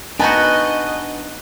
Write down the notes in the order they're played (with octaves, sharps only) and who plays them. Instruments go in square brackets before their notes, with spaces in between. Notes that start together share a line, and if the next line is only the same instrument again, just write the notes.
[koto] B3 D#4 F#4 [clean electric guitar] D4 G#5 A5 [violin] B4 D#5